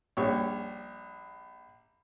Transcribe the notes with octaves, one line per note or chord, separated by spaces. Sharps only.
A#1 G3 C#4 C#5